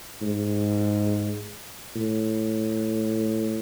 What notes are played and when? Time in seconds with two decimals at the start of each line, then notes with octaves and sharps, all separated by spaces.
0.22 G#2
1.96 A2